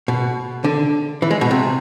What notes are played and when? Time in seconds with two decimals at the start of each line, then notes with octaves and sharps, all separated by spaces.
0.08 B2
0.64 D3
1.22 E3
1.31 G#3
1.41 B2
1.51 C3